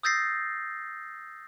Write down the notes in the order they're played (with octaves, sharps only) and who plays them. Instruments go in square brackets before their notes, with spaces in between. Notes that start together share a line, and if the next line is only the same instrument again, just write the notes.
[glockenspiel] D#6 E6 G6 A6 A#6 C7